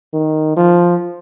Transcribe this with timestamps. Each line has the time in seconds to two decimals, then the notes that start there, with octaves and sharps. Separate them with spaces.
0.13 D#3
0.57 F3